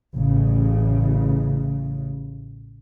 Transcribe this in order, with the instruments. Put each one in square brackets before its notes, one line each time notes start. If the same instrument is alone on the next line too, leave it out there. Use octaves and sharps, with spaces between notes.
[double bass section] A1 C#3